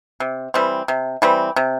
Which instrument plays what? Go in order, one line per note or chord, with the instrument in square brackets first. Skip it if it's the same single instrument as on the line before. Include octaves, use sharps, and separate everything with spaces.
[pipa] C3
E3 G3 C4
C3
E3 G3 C4
C3